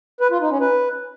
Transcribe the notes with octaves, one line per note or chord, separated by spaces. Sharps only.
B4
F4
D#4
C#4
B4